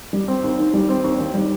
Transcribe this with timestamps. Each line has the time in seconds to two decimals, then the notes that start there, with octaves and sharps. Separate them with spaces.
0.13 G3
0.28 C4
0.43 D#2
0.59 D#3
0.74 G3
0.89 C4
1.04 D#2
1.20 D#3
1.34 G3